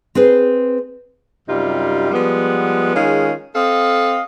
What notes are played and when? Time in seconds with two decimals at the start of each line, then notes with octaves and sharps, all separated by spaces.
0.15 C4 G#4 B4 C5
1.48 F#2 C3 G3 D#4 F4
2.11 F3 G3 G#3 B3
2.94 D#3 G#3 C#4 F4 G#4
3.54 C4 A4 D#5 F5